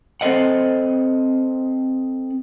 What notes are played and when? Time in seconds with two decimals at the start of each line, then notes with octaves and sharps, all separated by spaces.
0.21 C4 A4 C5 D#5 F#5